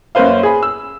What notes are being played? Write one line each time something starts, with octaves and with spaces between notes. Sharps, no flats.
F#2 A#3 C#4 B4 C5 F5
G#4 B5
E6